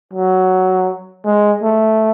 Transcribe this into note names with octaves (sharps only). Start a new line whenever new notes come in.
F#3
G#3
A3